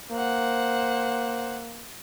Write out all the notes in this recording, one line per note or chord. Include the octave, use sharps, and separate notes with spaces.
A#3 C5 F#5